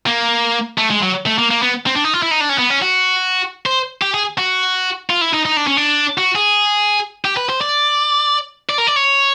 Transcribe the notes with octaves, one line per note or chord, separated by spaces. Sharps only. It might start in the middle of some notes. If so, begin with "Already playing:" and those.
A#3
A3
G#3
F#3
A3
A#3
A#3
B3
C4
D4
D#4
F4
E4
D#4
D4
C#4
B3
C#4
F#4
C5
G4
G#4
F#4
F4
E4
D#4
D#4
D4
C#4
D4
F#4
G#4
G4
B4
C5
D5
D5
A#4
D5
C#5